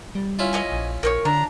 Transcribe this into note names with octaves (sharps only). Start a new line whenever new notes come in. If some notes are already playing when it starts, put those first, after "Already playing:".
G3
C#4 E4 F4
C#5 D#5 G#5
A#1
A#1 A#4 C5 C#5
D3 D4 A#5